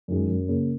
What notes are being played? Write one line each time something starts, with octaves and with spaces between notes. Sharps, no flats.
F#2 D#3 G#3
F#2
C#3 A#3